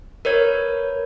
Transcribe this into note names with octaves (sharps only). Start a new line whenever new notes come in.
A#4 B4 C#5 G#6